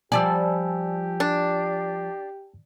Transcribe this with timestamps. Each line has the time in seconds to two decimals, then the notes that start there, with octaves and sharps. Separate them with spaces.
0.12 F3 G3 G4 D5 G#5 A5 E6
1.20 D4